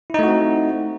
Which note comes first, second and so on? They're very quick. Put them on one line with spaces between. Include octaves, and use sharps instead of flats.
E4 D#4 A3 F#4 C4